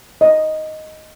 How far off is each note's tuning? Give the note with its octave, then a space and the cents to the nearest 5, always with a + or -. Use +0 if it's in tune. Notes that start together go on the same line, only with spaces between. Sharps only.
D#5 +0